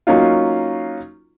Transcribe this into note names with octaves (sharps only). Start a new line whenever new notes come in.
F#3 A#3 C#4 D#4 F4